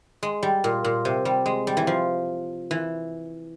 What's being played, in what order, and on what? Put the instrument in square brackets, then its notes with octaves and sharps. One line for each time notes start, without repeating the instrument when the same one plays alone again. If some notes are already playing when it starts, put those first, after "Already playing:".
[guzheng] G#3
G3
A#2
A#2
C3
G3
G#3
G3
E3
F3
E3